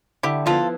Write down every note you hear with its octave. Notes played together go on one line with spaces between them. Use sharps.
D3 E4 G4
F3 B3 E4 F4 A4